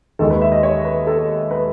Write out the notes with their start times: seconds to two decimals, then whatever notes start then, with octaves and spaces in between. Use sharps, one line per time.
0.19 D#2 D#3 G#3 A4
0.30 B4
0.41 E5
0.52 D#5
0.63 C#5
0.85 B4
1.07 A4
1.51 B4